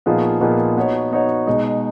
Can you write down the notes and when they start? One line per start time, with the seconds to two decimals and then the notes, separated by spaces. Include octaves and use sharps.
0.06 A#2 F3 B3 D#4 G#4
0.41 A#2 F3 B3 D#4 G#4
0.77 B3 D#4 F#4 C#5
1.12 B3 D#4 F#4 C#5
1.47 B2 G#3 D#4